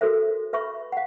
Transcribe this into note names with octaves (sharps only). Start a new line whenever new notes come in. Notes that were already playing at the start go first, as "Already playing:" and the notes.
F#4 A4 A#4 C5 E5
B4 E5 B5 C#6
F5 F#5